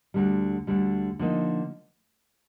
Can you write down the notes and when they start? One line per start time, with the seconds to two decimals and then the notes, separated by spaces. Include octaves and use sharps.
0.14 D2 D3 G3
0.67 D2 D3 G3
1.19 D3 F3 A#3 D#4